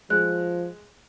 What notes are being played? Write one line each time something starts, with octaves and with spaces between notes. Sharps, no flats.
F3 G#3 F#6